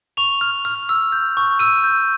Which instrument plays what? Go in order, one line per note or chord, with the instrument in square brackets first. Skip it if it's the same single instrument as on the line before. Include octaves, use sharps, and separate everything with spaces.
[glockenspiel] C#6 F7
F6
F6
E6
G6
C#6
E6 D#7
G6